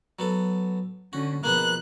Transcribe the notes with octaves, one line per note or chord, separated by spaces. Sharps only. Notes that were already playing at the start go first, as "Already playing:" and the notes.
F#3 B3 A4
D3 C#4 F#4
B2 F3 A#3 G#4 B4 F#6